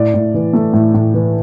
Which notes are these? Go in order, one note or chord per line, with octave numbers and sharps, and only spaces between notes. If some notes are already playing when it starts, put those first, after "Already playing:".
Already playing: A2 D5
A2
E3
A3
A2
A2
E3